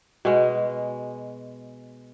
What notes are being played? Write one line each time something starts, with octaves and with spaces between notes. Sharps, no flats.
B2 G#3